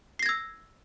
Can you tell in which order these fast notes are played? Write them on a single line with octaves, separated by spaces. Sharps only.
C7 A#6 G#6 E6